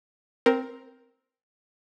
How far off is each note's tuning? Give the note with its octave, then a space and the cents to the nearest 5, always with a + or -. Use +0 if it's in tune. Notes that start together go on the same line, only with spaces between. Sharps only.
C4 +0 A#4 +10